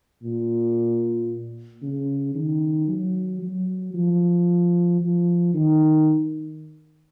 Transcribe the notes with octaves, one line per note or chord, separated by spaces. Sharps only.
A#2
C#3
D#3
F#3
F#3
F3
F3
D#3